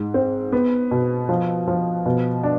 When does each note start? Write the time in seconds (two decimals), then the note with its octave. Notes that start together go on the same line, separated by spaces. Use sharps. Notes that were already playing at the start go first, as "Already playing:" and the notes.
Already playing: G#2
0.14 C4
0.52 B3
0.91 B2
1.29 F3
1.68 F3
2.06 B2
2.43 D4